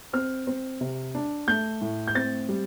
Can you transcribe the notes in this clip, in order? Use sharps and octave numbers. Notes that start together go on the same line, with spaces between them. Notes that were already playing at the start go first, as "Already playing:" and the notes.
C4 F6
C4
C3
D4
A3 G6
A2
G6
C4 A6
G3